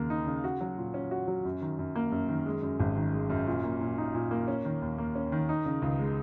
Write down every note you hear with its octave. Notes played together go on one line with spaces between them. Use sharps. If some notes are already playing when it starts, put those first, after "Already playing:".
Already playing: D#2 C#3 A#3
D#4
C#3
F#4
F#3
A#2
C#4
F#4
F#3
F#2
D#3
F#2
A#3
F#2
D#3
G#3
F#2
G#1
D#3
G#3
F#2
A#2
A#3
A#2
D#4
A#2
A#3
C#4
D#3
D#2
A#3
C#4
D#3
D#4
C#3
C#2
G#3